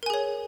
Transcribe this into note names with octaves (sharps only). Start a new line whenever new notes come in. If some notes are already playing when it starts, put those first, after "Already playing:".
G#4 A#4 C#5 G#5